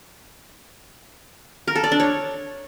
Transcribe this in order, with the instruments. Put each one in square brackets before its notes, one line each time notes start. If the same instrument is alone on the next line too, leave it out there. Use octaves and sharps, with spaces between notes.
[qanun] A#4
A4
D5
D4
C#5